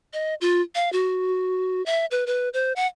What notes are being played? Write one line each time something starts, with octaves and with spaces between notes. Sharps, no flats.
D#5
F4
F5
F#4
E5
B4
B4
C5
F#5